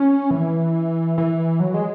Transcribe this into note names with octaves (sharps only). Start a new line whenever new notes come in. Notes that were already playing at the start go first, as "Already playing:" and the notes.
Already playing: C#4
E3
E3
F#3
G#3